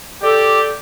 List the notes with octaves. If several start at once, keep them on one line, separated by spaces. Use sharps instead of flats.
G4 A4 D5